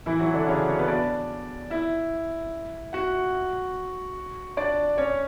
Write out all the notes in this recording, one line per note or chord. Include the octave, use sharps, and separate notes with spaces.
E3 E4
F#3 F#4
D3 D4
C#3 C#4
C#4 C#5
B3 B4
D4 D5
E4 E5
F#4 F#5
D4 D5
C#4 C#5